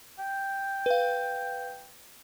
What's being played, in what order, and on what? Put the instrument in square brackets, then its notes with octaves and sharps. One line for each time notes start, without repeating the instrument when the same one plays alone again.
[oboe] G5
[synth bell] B4 F5